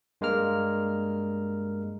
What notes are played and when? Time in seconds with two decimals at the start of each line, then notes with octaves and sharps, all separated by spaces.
0.21 G2 G#3 A#3 A#4 F6